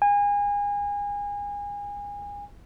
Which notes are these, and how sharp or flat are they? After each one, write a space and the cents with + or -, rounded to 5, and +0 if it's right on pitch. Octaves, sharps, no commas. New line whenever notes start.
G#5 -30